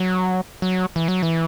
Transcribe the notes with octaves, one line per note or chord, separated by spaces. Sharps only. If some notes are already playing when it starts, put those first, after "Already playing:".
Already playing: F#3
F#3
E3
F#3
E3